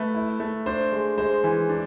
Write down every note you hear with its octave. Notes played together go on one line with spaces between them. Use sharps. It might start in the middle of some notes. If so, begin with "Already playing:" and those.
Already playing: A3 B4
E4
A3
D4 C5
G#3
G#3 C5
E3
D4